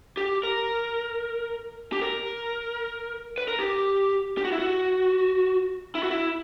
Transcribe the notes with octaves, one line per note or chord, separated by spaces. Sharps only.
G4
A#4
G4
A#4
B4
A#4
G4
G4
F#4
E4
F#4
E4
F#4
E4